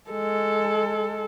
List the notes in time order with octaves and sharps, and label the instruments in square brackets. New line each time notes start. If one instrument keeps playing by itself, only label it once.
[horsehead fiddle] G#3 A4